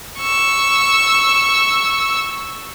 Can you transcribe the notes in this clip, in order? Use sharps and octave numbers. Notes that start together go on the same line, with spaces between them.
C#6 E6